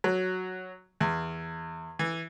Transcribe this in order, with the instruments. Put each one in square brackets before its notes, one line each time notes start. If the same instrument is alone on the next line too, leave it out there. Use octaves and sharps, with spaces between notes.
[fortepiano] F#3
E2
E3